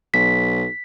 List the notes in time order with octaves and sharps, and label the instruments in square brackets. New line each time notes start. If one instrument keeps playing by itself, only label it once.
[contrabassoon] B1 [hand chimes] B6